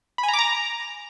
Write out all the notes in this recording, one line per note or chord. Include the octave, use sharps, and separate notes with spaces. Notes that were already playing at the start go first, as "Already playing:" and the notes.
B5
G#5
A#5
D6
A#5